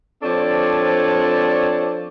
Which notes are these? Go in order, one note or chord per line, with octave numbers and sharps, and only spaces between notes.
F3 C4 D4 A4 C#5 D5